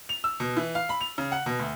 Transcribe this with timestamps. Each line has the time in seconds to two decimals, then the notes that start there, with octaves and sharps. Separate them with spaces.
0.09 F7
0.24 E6
0.40 B2
0.57 E3
0.75 F5
0.89 B5
1.01 F7
1.18 C#3
1.32 F#5
1.46 B2
1.59 D2